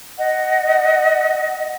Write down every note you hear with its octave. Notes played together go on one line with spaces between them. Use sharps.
D#5 F#5